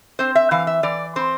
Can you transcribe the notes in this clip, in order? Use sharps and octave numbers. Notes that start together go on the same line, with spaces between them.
C4 C5
E5
E3 F5
E5
E3 D5
C4 C5